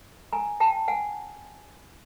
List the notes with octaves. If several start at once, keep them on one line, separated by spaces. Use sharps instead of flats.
G#5 A#5
G5 A5
F#5 G#5